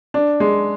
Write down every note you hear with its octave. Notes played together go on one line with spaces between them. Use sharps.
D4
G#3